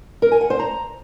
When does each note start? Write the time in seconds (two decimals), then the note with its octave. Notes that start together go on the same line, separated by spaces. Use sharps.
0.22 A#4
0.32 G#5
0.41 F#5
0.50 C5
0.60 A#5